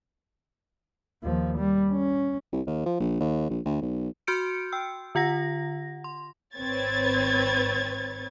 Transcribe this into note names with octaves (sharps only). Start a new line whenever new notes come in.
D#2 F3
G3
C#4
C2
D#2
F3
A#1
D#2
A#1
D2
B1
F#4 C6 F6 G6 C#7 D7
G5 E6
D3 F4 F#5 A#6
C6
G#1 C4 B4 C#5 G#6 A6